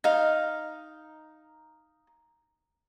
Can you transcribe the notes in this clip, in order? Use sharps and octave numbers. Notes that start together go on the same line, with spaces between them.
D#4 F5